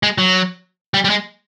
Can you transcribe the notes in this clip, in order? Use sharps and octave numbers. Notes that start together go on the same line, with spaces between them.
G#3
F#3
G3
G3
G#3